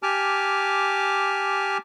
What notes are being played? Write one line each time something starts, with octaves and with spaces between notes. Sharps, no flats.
G4 G#5 A5 D6 F6